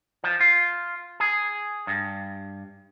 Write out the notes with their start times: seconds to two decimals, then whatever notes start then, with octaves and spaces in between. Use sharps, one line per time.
0.24 F3
0.41 F4
1.20 G#4
1.87 G2